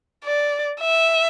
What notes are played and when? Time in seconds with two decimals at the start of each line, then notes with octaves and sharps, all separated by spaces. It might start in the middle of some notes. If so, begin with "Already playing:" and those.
0.24 D5
0.81 E5